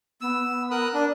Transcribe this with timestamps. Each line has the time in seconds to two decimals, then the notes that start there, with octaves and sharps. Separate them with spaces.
0.21 B3 E6
0.71 A#4 D#6 F#6
0.94 D4 A#4